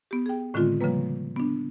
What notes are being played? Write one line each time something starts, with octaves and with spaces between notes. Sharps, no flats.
B3 G4
G#4 G5
A2 D3 D#3 G#3 C4 F4
C#3 F3 G3 A#3 B4
B3 D4